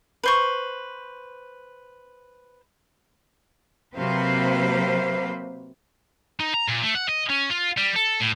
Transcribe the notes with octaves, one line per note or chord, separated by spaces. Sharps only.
B4 C5 C#6
C3 F#3 A#3 B4 C5 F5
D#4
A#5
A#2
A3
F#5
D#5
C#4
F4
G3
A4
A2